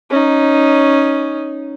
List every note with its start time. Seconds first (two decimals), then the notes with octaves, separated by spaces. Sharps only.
0.10 C#4 D#4